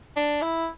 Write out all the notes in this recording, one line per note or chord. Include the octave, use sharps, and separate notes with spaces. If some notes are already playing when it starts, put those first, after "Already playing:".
D4
E4